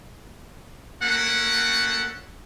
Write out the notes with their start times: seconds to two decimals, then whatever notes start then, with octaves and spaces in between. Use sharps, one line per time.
1.01 A3 A#3 C#4 F#4 A4 F#5